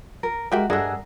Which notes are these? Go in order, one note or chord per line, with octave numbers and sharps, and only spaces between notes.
A#4
G#3 F#4 G4 A#4 E5 G5
G2 G#3 A3 D4 G#4 A#4 F#5 E6